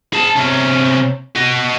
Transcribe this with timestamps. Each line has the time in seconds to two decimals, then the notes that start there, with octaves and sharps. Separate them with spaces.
0.13 G#4 A5
0.36 C3 C#4
1.35 F#4 D#5